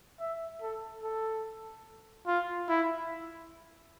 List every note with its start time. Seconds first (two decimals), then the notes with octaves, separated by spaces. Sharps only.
0.20 E5
0.62 A4
1.03 A4
2.27 F4
2.69 E4